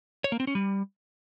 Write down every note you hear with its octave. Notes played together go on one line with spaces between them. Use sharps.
C#5
A#3
C4
C#4
G3